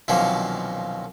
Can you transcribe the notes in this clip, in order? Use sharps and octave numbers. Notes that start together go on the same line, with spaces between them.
C2 F#2 B2 D#3 F3 A#3